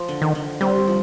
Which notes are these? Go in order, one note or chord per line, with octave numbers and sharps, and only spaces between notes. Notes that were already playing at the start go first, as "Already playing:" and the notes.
Already playing: F3
D3
D#3
D3
G3 C4
F3